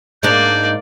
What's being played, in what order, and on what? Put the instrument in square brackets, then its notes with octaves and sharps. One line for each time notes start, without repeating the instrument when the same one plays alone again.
[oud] G#2 D4 [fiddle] A#3 D5 [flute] G6